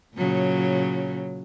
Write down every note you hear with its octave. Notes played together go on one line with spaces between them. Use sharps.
A#2 C#3 F#3